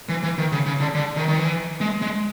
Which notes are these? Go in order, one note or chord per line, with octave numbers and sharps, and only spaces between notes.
E3
E3
D#3
C#3
C#3
D3
D3
D#3
D#3
E3
G#3
G#3